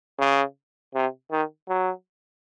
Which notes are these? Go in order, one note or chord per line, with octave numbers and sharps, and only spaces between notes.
C#3
C3
D#3
F#3